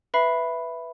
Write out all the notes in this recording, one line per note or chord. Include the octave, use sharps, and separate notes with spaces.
B4 E5 B5 C7